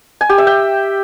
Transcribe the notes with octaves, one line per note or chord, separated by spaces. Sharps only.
G#5
G4
E5
G5